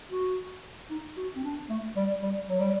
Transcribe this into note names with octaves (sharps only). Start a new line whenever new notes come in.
F#4
D#4
F#4
C4
D4
A3
G3
G3
F#3
G3